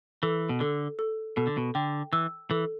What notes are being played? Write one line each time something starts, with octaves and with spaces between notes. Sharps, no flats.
E3 A4
B2
D3 A4
A4
B2 A4
D3
B2
D3 G5
E3 E6
E3 A4